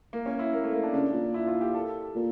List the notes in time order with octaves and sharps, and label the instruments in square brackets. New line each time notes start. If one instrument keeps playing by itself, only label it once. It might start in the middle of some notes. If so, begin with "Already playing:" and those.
[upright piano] A#3
C#4
E4
A#3
A3
A#3
D4
[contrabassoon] C#3 [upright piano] D4
[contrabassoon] A#2
[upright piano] E4
F4
G4
A4
[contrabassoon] A#2